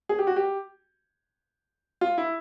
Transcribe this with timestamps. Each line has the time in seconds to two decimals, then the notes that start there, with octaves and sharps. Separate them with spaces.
0.09 G#4
0.19 G4
0.27 F#4
0.36 G4
2.01 F4
2.18 E4